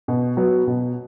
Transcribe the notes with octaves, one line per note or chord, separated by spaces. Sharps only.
B2
F#3 B3
B2